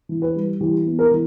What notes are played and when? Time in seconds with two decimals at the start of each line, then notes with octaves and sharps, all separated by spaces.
0.09 E3
0.22 B4
0.35 G3
0.60 E3 G4
0.86 B3
0.99 A#4
1.11 E3